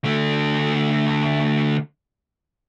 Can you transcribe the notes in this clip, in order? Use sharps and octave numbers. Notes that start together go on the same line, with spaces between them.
D3 A3